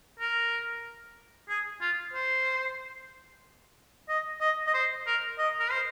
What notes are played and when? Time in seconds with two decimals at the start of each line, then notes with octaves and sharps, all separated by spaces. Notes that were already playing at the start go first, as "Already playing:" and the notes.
0.19 A#4
1.49 G#4
1.81 F4
2.14 C5
4.09 D#5
4.40 D#5
4.67 D#5
4.74 C5
5.06 A#4
5.38 D#5
5.60 A#4
5.71 C5